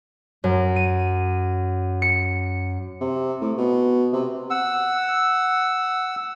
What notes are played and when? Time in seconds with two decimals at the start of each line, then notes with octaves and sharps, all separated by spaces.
0.44 F#2
0.76 D#7
2.02 C#7
3.01 C3
3.42 A2
3.58 B2
4.13 C3
4.50 F#5 E6